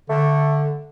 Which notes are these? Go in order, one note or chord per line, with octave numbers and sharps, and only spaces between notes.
D3 A3